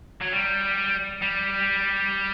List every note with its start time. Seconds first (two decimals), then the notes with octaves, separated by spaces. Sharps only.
0.22 F#3
0.33 G3
1.22 G3